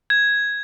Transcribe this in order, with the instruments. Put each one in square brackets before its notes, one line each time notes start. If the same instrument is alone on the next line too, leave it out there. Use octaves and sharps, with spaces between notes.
[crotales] G#6